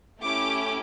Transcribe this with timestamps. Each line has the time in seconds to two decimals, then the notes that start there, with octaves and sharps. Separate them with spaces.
0.21 A3 C#4 E4 G4 D6